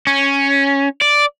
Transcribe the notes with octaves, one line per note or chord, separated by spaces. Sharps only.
C#4
D5